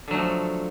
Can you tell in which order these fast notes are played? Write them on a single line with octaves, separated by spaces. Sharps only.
D3 F#3 A3 F3